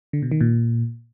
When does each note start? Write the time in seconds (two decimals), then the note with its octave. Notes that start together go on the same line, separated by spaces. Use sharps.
0.13 D3
0.22 B2
0.31 D#3
0.41 A#2